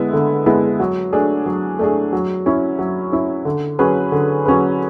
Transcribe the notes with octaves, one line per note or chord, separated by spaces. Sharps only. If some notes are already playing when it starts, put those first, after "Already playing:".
Already playing: D3 G#3 B3 E4
D3
G#3 B3 E4
F#3
A3 D4 G#4
F#3
A3 D4 G#4
F#3
C#4 E4
F#3
C#4 E4
D3
F#3 C#4 G#4 B4
D3
F#3 C#4 G#4 B4